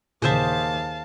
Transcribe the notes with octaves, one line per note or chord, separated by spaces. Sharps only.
D#2 A#2 C#3 G#4 C5 E5 F5 A5